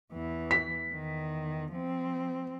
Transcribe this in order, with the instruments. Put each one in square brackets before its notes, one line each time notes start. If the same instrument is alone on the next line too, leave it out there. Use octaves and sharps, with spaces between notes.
[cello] E2 E3
[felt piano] B6
[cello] E2 D#3
F3 C4